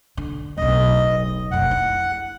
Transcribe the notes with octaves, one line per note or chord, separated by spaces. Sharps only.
D3
D1 B1 D#5
F1 F#2 F#5
E4